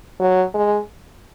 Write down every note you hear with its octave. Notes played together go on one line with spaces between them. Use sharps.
F#3
G#3